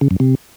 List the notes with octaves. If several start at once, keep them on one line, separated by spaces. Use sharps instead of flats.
C#3
F#2
C3